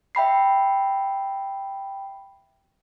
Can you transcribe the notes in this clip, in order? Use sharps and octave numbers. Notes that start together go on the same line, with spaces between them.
E5 G5 B5 C7